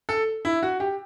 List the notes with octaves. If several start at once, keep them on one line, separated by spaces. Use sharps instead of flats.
A4
E4
F#4
G4